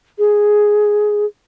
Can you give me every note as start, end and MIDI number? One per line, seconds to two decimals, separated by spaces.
0.19 1.26 68